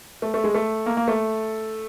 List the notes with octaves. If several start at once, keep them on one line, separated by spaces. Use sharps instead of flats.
A3
A3
G#3
A3
A#3
A#3
A3